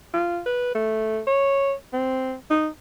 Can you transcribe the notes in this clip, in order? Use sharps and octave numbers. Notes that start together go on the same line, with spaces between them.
F4
B4
A3
C#5
C4
D#4